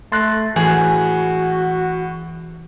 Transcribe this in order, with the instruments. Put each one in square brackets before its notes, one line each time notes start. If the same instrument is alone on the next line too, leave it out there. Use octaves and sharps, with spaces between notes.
[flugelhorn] A3 [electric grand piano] C6 F#6 [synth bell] A6 A#6
[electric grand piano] A2 [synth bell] E3 [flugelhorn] F#4 [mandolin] G#4